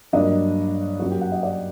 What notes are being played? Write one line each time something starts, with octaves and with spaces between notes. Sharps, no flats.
G2 F#3 A#3 D4 D#5
F#2 F#3 A#3 F#4
G4
F#5
D#5
D5